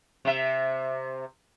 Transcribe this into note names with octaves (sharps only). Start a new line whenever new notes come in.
C3 E5